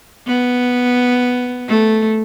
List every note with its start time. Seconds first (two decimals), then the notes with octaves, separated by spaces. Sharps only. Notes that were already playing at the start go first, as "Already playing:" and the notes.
0.27 B3
1.69 A3